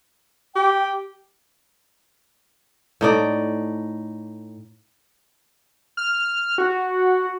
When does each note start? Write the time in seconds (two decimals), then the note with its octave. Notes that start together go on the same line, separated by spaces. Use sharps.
0.55 G4 G5
3.01 A2 D#4 D5
5.97 F6
6.58 F#4